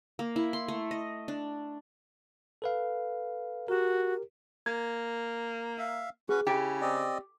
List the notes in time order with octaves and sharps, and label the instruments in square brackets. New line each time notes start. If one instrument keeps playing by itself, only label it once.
[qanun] A#3
E4
C6
A3
D#5
D4
[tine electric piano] A4 B4 F5
[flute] F#4 [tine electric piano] G4 A#4
[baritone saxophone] A#3 [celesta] G#6
[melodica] E5 F5
[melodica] C#4 F#4 B4 [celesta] G#4
[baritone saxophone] C#3 [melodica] E4 [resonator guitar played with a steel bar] G4
[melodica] C4 D5 D#5